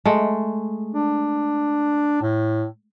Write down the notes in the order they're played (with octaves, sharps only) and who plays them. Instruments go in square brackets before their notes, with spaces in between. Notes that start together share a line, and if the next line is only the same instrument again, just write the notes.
[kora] G#3 A3
[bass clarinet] D4
A2